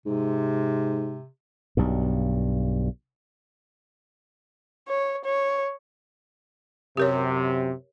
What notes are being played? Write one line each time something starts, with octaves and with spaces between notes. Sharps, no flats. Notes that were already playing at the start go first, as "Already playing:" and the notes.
G#2 C3
B1 G2
C#5
C#5
F#2 C3 G4 A#4 C#5